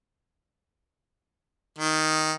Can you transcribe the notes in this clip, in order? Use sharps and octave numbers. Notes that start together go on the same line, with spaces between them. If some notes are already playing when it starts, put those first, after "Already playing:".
D#3